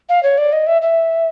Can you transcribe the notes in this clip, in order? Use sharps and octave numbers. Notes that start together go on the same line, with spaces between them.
F5
C#5
D5
D#5
E5
E5